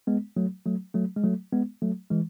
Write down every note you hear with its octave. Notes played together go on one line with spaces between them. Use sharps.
G#3 B3
F#3 A3
F#3 A3
F#3 A3
G#3
F#3 A3
G#3 B3
F#3 A3
E3 G#3